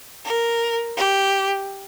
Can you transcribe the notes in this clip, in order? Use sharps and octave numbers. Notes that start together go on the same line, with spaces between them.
A#4
G4